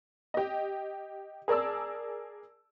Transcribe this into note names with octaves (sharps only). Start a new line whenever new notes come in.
G4 D#5
G#4 A#4 D5 A5 E6